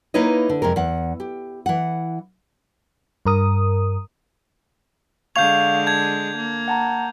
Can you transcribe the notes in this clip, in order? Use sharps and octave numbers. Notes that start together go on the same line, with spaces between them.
A#3 D#4 E4 B4 C#5 D#5
D3
F2 C3 G#3 A#4
E2 F#5
G4
E3 F#5
G2 A#4 D#6
D3 G#3 F5 C#6 G6 G#6 F7
A5 G6 G#6
A#3
F#5 A5 A#5